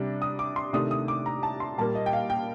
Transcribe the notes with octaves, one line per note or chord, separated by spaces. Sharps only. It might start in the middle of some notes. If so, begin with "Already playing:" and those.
Already playing: C3 G3 D4
D#6
D6
C6
C3 D#3 A3 D4 D#6
D#6
D6
A#5
A5
C6
A#2 G3 A#3 A5
D#5
G5
F5
G5